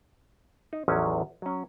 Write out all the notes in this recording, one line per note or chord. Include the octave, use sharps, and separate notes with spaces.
D#4
A1 E2 F3 F#3 C#4 G#5
F#3 C#4